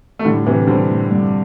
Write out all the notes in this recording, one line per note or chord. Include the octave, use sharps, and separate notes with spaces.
A3
A2 D3 G3
A2 C3 E3
D3 G3 C4
A2
G2